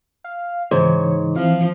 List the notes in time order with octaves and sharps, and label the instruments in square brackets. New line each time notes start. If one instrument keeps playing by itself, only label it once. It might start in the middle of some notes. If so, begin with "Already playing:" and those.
[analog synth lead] F5
[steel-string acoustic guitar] G#2 [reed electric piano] C#3 E3 [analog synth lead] C#5
[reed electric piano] E3 C4 E4 [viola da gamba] F3 [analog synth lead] F5